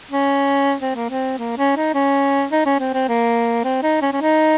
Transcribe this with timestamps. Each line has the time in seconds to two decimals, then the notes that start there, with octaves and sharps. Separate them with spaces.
0.11 C#4
0.81 C4
0.95 A#3
1.10 C4
1.38 A#3
1.57 C#4
1.76 D#4
1.94 C#4
2.51 D#4
2.66 C#4
2.79 C4
2.94 C4
3.08 A#3
3.64 C4
3.83 D#4
4.02 C#4
4.13 C#4
4.21 D#4